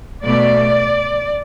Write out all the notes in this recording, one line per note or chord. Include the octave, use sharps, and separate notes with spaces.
B2 A3 D5